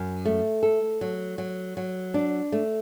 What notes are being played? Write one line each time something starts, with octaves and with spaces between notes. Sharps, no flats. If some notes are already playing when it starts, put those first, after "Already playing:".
Already playing: F#2
A3
A4
F#3
F#3
F#3
D4
A3